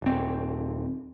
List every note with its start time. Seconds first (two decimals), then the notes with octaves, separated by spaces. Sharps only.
0.02 D#1 C4